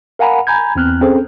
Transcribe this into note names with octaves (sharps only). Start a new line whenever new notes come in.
A#4 F5 F#5 G#5 A#5 B5
G#5 A#5 B5 G6 G#6
E2 C4 F6 F#6
C4 C#4 G#4 A4 C5